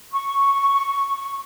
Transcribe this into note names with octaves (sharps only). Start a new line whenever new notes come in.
C#6